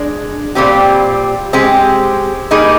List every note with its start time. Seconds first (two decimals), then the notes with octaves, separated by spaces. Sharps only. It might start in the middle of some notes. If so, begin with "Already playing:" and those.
Already playing: G#3 D4 G#4
0.55 A#2 G3 C4 G4
1.53 G#3 C4 G4
2.51 G3 A#3 D#4 G#4